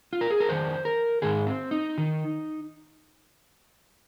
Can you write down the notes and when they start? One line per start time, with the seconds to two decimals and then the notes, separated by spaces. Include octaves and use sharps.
0.13 F4
0.21 A#4
0.30 G#4
0.40 A#4
0.49 F2 D#3 C5
0.85 A#4
1.22 G#2 D#3 G#4
1.47 C4
1.71 D#4
1.98 D#3